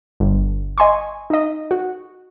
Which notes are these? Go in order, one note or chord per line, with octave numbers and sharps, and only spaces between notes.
G1
D#5 G#5 C6 C#6
D#4 D#5
F#4